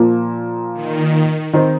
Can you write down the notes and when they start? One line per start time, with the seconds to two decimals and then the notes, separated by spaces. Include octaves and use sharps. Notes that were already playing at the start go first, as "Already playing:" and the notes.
Already playing: A#2 F3 A#3
0.73 D#3
1.53 D#3 C4 D#4 C5